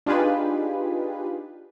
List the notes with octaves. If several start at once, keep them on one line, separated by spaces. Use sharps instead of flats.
D4 D#4 F4 G4 G#4 B4